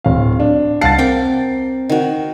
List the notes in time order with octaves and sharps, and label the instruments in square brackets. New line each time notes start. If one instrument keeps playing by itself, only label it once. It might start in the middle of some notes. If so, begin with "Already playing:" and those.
[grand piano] D1 F5
D4
[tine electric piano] C2 F5 A5 [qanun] F#5 [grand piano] A6 C7
[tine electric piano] C4 [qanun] A#4 G5 D6
[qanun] D#3 F#4